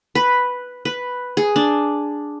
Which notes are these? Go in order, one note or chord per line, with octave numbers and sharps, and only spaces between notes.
B4
B4
G#4
D4